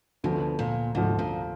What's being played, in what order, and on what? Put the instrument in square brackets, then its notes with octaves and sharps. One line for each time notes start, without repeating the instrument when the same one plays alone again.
[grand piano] D2 D3 F3 [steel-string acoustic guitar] B2
[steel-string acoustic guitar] A#2
[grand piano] D2 D3 F3 [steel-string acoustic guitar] G#2
[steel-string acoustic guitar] A#2